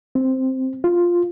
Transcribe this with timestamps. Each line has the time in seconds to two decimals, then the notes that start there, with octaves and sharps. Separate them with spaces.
0.15 C4
0.84 F4